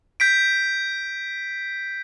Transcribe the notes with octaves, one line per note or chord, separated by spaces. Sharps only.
G6 B6 D7